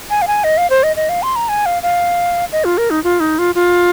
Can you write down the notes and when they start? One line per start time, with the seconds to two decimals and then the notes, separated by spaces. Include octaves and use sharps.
0.10 G#5
0.22 F5
0.27 G#5
0.44 D#5
0.57 F5
0.70 C5
0.83 D#5
0.96 D#5
1.09 F5
1.23 C6
1.36 A#5
1.49 G#5
1.66 F5
1.83 F5
2.52 D#5
2.64 F4
2.78 A#4
2.90 D#4
3.04 F4
3.20 D#4
3.39 F4
3.55 F4